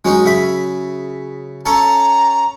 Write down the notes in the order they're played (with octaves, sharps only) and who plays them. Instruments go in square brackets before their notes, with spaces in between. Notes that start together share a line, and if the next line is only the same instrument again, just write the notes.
[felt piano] F#3 [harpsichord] G#3 C#4 D#4
[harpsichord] C#3 E5 B5
[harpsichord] C#4 A4 A5 [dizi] A#5